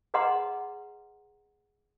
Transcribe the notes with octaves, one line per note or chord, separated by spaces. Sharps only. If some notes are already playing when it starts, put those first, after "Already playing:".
G#4 B4 D#5 F#5 A#5 C6